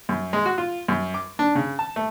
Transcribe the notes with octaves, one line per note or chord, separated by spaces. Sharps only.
F#2
G#3
F#4
F4
F#2
D6
D4
C#3
A5
A3